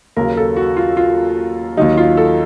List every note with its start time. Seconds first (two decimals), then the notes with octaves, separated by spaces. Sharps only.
0.16 D#2 C#3 F#3 A#4
0.37 A4
0.57 F#4
0.77 F4
0.97 F4
1.77 D#2 D#3 F#3 D#4
1.97 F4
2.17 A4